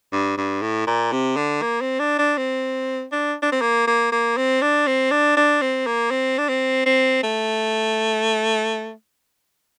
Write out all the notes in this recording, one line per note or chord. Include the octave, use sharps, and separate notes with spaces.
G2
G2
A2
A#2
C3
D3
A#3
C4
D4
D4
C4
D4
D4
C4
A#3
A#3
A#3
C4
D4
C4
D4
D4
C4
A#3
C4
D4
C4
C4
A3